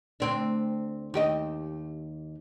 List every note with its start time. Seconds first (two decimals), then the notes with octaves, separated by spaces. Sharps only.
0.20 D2 C4 D4
1.14 D#2 G4 D#5